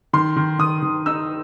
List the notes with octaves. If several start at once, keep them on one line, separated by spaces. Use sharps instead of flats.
D#3 C6
D#3
D#3 D#6
D#3
D#4 E6